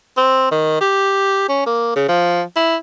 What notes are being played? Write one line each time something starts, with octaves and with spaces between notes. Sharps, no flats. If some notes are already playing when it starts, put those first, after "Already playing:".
C4
D#3
G4
C#4
A#3
C#3
F3
E4